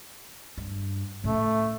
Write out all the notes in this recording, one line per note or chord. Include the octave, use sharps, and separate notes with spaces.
G2
A2 A3 C#4